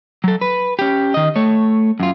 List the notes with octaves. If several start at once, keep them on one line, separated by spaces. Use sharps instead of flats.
F#3 A4
B4
C#4 G4
D#3 D#5
A3 C#5
F#2 F4